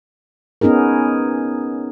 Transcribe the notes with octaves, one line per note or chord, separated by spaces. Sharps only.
B3 C#4 D#4 G#4 A#4